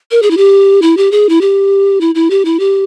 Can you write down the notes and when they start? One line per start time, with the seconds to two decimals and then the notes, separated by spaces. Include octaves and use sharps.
0.11 A#4
0.22 G#4
0.31 E4
0.37 G4
0.82 E4
0.97 G4
1.12 G#4
1.29 E4
1.41 G4
2.01 E4
2.15 E4
2.30 G4
2.45 E4
2.60 G4